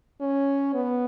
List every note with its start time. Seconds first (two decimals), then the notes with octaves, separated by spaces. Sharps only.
0.21 C#4
0.74 B3